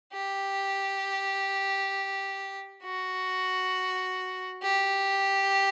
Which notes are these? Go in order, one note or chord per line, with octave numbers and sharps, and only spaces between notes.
G4
F#4
G4